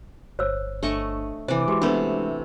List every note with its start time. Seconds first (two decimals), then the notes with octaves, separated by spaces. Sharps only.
0.39 G1 C5 C#5 E6
0.83 G1 A3 D4 D#5 C#6
1.48 C3 E3 C5 D5
1.68 G#3 F#4 G4 D6
1.82 C3 A3 B3 D4 B4